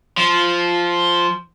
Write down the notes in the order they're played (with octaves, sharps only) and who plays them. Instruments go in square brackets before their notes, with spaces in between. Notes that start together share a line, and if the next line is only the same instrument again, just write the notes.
[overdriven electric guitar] F3